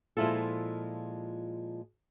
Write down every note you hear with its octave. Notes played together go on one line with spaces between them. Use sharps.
A#2 F3 G#3 E4 F4 A4